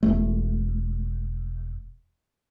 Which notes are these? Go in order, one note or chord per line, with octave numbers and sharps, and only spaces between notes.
E1 A3